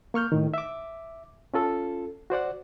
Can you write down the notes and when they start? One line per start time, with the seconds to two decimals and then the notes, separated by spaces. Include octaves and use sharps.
0.14 A#3 C#6 F6 G6
0.32 A2 D#3
0.54 E5 D6
1.54 C#4 F4 A4
2.30 F#4 C5 D5 F#5